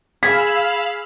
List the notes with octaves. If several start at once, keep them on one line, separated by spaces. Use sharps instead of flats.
G#4 F5 B5 E6 B6